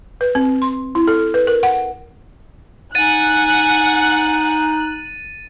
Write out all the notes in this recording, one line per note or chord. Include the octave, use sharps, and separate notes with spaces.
B4
C4
C6
E4
A4
B4
A#4
F#5
D#4 F#5 G#5 F#6 A6 D#7